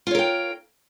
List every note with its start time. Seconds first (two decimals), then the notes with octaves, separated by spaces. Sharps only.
0.07 F4
0.11 C#5
0.15 A#4
0.19 G5